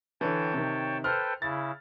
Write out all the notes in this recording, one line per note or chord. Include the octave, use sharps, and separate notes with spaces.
D3 E3 C#5 G5 A5
C3 D#3
A4 B4 C5 G5 F6
C#3 E4 A6